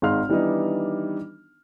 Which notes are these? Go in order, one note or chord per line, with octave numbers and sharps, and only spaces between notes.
G#1 G#3 D#4 F5 C6 F6
D#3 E3 G3 B3 D4 D#4